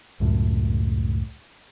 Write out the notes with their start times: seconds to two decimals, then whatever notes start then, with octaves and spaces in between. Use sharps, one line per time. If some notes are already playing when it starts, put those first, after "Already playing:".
0.20 C#2 F#2 A2